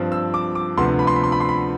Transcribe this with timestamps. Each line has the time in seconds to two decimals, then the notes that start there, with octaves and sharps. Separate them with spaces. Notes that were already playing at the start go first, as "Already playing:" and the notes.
Already playing: G2 F3 C4
0.12 E6
0.34 D6
0.55 D6
0.77 D2 C3 F3 B3 D4 C6
0.99 B5
1.07 C6
1.16 B5
1.24 C6
1.32 B5
1.41 C6
1.49 B5